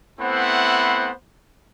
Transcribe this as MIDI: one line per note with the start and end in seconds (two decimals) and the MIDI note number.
0.20 1.11 57
0.20 1.11 59
0.20 1.11 60
0.20 1.11 64
0.20 1.11 72
0.20 1.11 78